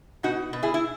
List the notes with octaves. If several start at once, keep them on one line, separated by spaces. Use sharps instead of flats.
B2 D#4 F#4
B2
E4 G#4
E4